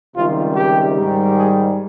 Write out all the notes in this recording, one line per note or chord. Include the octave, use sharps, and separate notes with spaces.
C#2 C3 D#3 G3 F4
G4
G#2 D#3 G3
G#4